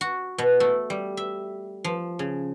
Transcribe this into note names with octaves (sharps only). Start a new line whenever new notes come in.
F#4
B2
A3
G3
E5
F3
C#3